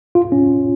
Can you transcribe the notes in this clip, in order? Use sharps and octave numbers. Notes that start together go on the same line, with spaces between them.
F4
C#4